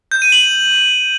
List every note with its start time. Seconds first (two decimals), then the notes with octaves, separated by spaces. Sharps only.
0.12 G6
0.22 D#7
0.32 F#7